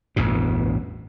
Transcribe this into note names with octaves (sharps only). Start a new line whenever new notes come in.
A1 E2 G2 B2